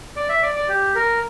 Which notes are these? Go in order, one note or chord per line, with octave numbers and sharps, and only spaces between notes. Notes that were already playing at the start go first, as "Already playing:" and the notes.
D5
E5
D5
D5
G4
A#4